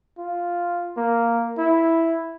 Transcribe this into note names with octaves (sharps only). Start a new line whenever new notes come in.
F4
A#3
E4